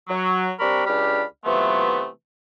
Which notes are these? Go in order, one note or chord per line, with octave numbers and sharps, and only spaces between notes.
F#3
G3 C4 D4 A#4 B5 C#6
C#2 D4 G4 B5 F6
C3 E3 F#3 A3 B3 F4